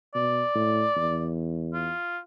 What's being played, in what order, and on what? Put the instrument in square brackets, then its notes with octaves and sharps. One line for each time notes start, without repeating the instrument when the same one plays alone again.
[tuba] B2 [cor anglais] D5
[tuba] A2
E2
[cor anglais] F4